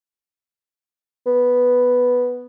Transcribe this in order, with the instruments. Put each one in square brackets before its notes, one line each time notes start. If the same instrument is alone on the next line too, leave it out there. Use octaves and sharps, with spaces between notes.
[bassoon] B3